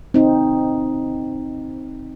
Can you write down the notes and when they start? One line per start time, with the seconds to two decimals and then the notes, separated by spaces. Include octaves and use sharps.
0.14 C4 D#4